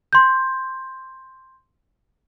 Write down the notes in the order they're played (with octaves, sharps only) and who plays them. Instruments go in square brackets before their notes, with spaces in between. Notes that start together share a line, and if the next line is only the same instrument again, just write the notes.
[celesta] C6 G6